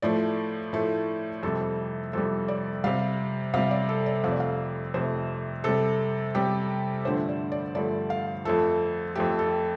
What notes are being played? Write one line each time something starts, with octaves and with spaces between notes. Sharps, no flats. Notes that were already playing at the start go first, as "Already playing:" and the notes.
A2 F3 A3 D5
A2 F3 A3
F2 C3 G3 A4
F2 C3 G3 A4
D5
C3 G3 F5
C3 G3 F5
D5
A4
D5
F2 C3 A3 F5
D5
F5
F2 C3 A3 C5
C3 G3 A4
C3 G3 G4
G2 D3 F3 A3 C5
D5
D5
G2 D3 F3 A3 D5
F5
F2 F3 A3 A4
F2 F3 A3 G4
A4